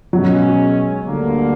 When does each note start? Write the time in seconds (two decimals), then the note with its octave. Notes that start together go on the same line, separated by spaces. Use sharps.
0.12 B2 F#3 G#3 C#4
1.06 D2 D3 G3 A#3